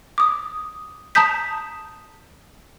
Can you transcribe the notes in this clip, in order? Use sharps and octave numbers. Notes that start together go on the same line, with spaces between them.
D6 D#6
A5 A#5 D#6 G6 B6